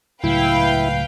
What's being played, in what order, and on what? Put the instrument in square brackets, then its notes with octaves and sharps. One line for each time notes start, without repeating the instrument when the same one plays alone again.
[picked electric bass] C#2 A2 F#3 [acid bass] E4 [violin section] B4 F5 G5